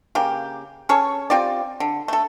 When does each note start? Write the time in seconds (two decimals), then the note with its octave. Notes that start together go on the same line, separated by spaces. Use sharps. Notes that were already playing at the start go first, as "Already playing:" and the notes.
0.15 C#3 A#3 G4
0.89 C#4 G#4 A4 C#5
1.30 C4 F4 G4 D5
1.80 D3
2.08 A3 A4